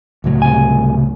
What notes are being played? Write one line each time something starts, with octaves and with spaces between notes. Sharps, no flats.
C#2 A2 F#3
C2 G#5